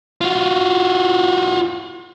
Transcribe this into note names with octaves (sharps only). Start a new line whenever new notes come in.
F4 F#4